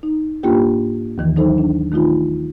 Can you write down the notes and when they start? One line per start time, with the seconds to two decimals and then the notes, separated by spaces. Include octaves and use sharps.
0.03 D#4
0.43 G#2 A#3 D4 F4 G4 G5
1.18 D#2 D#3 E3
1.36 F#3 D#4 A4 C5
1.58 D4
1.92 D#3 A3 D#4 F4